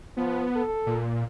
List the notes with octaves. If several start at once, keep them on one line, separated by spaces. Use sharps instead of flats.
F3 B3
A4
A#2